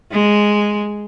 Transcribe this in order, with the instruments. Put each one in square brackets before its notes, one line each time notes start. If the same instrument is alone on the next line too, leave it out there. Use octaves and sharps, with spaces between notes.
[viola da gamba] G#3